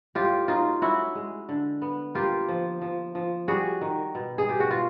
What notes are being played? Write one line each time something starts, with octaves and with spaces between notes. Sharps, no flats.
A2 F4 G4
F#3 D#4 F4
C#4 E4 F#4
G#3
D3
B3
A#3 F4 G4
F3
F3
F3
G3 F#4 G#4
D#3
B2
G#4
B2 G4
F#4
F4